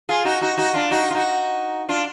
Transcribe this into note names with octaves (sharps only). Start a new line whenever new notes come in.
F4 G#4
D#4 F#4
D#4 F#4
D#4 F#4
D4 F4
D#4 F#4
F4
D#4 F#4
D4 F4